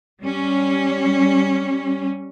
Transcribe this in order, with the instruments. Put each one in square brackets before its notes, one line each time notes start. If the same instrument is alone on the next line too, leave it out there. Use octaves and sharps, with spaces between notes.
[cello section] G3 C#4